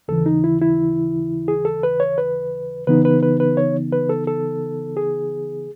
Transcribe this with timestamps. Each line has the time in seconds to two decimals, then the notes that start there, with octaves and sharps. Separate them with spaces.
0.08 D#2 C#3 E3 A4
0.26 D#4
0.44 E4
0.61 E4
1.48 G#4
1.65 A4
1.83 B4
2.00 C#5
2.18 B4
2.87 C#3 E3 B3 D#4 B4
3.05 B4
3.23 B4
3.40 B4
3.57 C#5
3.92 B4
4.09 A4
4.27 A4
4.97 G#4